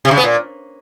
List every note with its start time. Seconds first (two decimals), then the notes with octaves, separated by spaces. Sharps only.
0.05 C3
0.11 C#3
0.17 B3
0.24 A#2